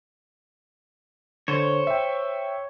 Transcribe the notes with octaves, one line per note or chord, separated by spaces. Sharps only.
D3 C5 C#5
E5 G5